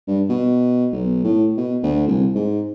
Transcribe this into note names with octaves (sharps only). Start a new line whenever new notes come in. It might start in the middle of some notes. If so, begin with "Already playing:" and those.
G2
B2
B1
A2
B2
D2
C2
G#2